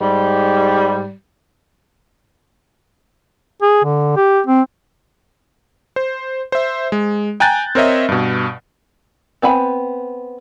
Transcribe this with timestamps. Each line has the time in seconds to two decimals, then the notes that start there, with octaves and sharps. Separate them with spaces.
0.01 G#2 G3
3.62 G#4
3.84 D3
4.17 G4
4.47 C4
5.96 C5
6.52 C5 E5
6.92 G#3
7.40 G5 G#5 A#5 F#6 G6 A6
7.75 C4 A#4 C#5 D#5 E5
8.09 G2 B2
9.42 B3 C4 G#5 B5